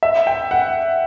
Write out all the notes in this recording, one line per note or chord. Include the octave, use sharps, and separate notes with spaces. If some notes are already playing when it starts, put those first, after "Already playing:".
E5
G5
F#5